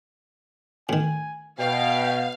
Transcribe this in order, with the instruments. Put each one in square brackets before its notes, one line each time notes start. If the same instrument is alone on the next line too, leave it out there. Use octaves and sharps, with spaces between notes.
[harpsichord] A2 D#3 [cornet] G#5
[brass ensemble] B2 [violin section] F5 [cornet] G5